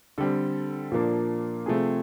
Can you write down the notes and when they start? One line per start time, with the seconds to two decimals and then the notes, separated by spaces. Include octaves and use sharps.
0.18 D3 G3 C4 A4
0.92 A#2 F3 A#3 D4
1.66 C3 F3 A3 C4 G#4